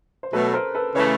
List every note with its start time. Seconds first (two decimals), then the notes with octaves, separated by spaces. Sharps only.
0.23 C5
0.33 B2 F#3 A3 A4 B4
0.53 A#4 C5
0.75 A4 B4
0.95 C#3 E3 A3 B4 C#5